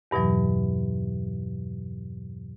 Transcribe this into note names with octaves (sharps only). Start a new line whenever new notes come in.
E2 G2 B2 E3 F#3